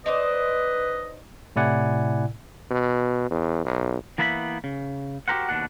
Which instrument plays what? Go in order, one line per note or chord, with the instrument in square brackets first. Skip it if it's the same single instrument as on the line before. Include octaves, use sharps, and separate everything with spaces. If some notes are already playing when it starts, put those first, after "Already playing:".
[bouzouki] D#4 C5 D5 [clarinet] B4 [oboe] D#5
[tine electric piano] A2 C3 E4 D5 F#5 G#5
[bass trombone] B2
E2
B1
[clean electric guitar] E3 A#3 B3 E4 G#5 B5
C#3
F#4 G4 A4 A#4 C5 F#5
D#2 B2 D4 F#5